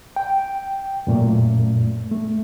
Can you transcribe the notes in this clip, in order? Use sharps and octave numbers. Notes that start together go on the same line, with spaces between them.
G5
F#2 A#2 A3
A3